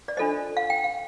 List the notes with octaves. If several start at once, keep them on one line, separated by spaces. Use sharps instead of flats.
D5
D4 F4 A4 C5 D#5
F5
G5
F5